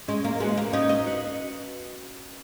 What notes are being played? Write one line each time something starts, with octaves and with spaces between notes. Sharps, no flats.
G#3 C#4
A#3
G#3 F#4 B4
A#3
C#4 D#4
D#4
F#4 B4